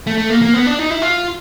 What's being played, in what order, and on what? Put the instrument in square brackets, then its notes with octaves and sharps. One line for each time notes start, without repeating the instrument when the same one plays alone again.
[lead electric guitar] A3
A3
A#3
A#3
B3
D4
D#4
E4
F4